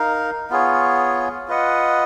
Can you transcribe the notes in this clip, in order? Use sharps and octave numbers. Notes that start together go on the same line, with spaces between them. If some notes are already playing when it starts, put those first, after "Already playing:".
Already playing: D#4 A#4 F5
B3 F4 G#4 C#5
F4 B4 D#5 F#5